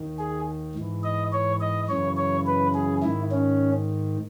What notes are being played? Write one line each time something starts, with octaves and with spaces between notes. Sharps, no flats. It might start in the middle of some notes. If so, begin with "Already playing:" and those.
Already playing: D#2 D#3
G#4
G#2 E3
D#5
C#5
D#5
F#2 C#3 E3 C#5
C#5
B4
G#4
G#2 D#3 E4
C#4